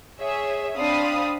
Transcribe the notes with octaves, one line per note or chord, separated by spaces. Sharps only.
G#4 C#5 E5
C4 D4 F5 B5 D#6